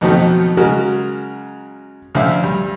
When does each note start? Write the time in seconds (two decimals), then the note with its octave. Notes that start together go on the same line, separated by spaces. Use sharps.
0.01 F2 B2 D#3 F3 F#3 A3
0.57 C#3 F#3 G#3 F#4 A#4
2.15 D2 F3 C#4 E5 F5
2.44 G2